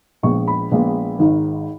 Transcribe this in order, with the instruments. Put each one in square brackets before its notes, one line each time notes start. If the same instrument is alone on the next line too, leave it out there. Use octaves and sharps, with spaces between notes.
[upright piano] A#1 A#2 G#3 B3 C#6
B5
A#1 A#2 G#3 B3
G#1 G#2 D#3